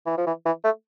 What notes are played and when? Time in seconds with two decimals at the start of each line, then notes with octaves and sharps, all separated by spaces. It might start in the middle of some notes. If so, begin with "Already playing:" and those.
0.06 E3
0.17 F3
0.27 E3
0.46 E3
0.64 A3